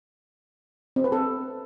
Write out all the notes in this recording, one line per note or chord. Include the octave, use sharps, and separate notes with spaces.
C4
B4
A4